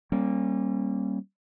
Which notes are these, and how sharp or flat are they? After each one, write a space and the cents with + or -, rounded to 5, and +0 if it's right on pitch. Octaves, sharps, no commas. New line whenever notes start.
G3 -10 A#3 +0 C#4 -35